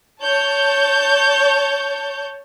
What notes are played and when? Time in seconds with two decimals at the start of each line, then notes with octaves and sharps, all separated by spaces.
0.21 C#5 A5 G6